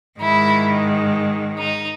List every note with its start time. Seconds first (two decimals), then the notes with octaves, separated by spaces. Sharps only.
0.20 G#2 D#3 G#3 E4
1.58 D#4